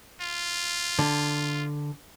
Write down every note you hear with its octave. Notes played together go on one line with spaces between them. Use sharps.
F4
D3